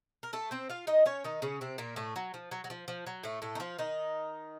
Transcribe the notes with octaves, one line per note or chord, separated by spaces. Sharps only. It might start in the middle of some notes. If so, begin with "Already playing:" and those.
A#4
A3 A4
C4 C5
F4 F5
D#4 D#5
C#4 C#5
D#3 D#4
C#3 C#4
C3 C4
A#2 A#3
A2 A3
F#3
F3
F#3
F#3
F3
F3
F#3
A2 A3
A2 A3
D#4
F3 F4
D#3 D#4